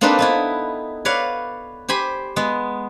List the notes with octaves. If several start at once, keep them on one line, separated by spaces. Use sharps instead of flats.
A#3 C4 D4 D#4 A4 B4
B3 D#4 E4
B4 C#5 D5 F5 F#5
G4 C5 G#5 B5
G#3 B3